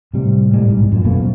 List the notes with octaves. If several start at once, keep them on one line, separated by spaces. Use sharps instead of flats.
A2 C3 G3
A2 G3 G#3
B1 G#2
F#2 A#2
F#2 B2 A3 A#3
F3